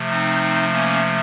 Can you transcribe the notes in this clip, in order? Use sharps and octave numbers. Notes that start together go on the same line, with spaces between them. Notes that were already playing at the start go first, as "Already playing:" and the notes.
Already playing: C3 F3 A3
C4 D#4
A#3 C#4